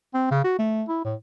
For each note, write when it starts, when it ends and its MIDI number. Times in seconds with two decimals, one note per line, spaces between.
0.14 0.29 60
0.31 0.43 49
0.44 0.56 66
0.59 0.84 57
0.89 1.04 64
1.05 1.15 45